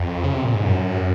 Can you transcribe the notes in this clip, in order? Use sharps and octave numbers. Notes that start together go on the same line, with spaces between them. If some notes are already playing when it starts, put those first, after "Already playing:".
Already playing: F2
C#3
C3
A#2
G#2
F#2